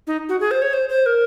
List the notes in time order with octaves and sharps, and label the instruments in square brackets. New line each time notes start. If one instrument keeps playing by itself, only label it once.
[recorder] D#4
F#4
G#4
C5
C#5
C5
C5
A#4